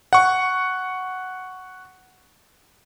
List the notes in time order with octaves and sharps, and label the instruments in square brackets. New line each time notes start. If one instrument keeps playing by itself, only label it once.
[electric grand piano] F#5 C#6